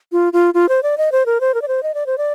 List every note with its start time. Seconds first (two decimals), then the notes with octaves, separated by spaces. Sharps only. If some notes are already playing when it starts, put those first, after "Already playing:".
0.12 F4
0.33 F4
0.54 F4
0.69 C5
0.83 D5
0.98 D#5
1.12 C5
1.26 A#4
1.41 C5
1.54 A#4
1.62 D5
1.68 C5
1.83 D#5
1.94 D5
2.07 C5
2.18 D5